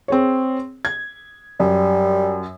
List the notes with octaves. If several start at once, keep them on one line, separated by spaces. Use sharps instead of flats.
C4 G#4 C#5
G#6
F#2 G3